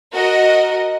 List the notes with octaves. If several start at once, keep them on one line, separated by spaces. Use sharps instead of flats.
F#4 A#4 D#5